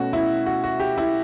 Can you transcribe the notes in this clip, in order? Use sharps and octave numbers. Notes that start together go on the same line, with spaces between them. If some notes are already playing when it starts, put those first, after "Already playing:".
Already playing: B2 A3 C#4 F#4
E4
F#4
F#4
G4
E4